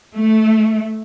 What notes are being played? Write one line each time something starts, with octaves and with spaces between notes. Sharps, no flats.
A3